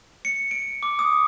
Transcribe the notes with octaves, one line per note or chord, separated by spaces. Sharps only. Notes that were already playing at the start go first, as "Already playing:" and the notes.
C#7
D7
D6
D#6